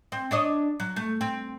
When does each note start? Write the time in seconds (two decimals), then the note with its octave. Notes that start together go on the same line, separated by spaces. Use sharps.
0.12 C4
0.31 D4 C#5 D#5
0.80 F#3
0.96 A3
1.21 C4